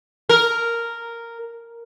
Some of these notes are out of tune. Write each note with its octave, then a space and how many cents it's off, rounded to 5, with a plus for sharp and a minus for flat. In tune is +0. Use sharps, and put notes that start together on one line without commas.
A#4 -5